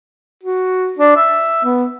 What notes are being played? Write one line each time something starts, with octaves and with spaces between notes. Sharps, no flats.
F#4
D4
E5
B3